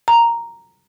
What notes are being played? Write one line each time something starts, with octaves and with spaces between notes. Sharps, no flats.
A#5